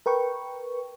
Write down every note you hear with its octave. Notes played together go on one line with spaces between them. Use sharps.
A#4 B4 G5 C#6